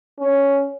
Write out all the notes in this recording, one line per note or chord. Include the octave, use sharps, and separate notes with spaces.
C#4